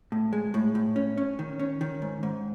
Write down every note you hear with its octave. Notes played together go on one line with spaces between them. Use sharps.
A2
G#3
A2
A2
C#4
C#4
D#3
C#4
D#3
G#2
G#2